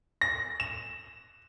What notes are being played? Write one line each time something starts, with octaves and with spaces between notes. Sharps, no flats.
A#6
E7